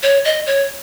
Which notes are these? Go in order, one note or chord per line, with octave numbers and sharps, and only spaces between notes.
C#5
D#5
C#5